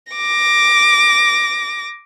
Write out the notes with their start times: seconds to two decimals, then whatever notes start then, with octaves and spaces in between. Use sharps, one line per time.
0.13 D6 A#6